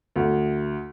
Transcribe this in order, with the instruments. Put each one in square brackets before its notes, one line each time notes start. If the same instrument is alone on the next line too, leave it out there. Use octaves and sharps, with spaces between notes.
[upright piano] D2